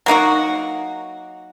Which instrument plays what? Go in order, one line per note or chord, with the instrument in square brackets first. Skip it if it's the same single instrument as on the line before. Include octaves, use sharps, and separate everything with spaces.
[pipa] F#3 A#3 D#4 F#4